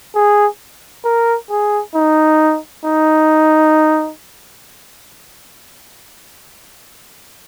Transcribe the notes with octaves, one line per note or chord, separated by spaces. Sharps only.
G#4
A#4
G#4
D#4
D#4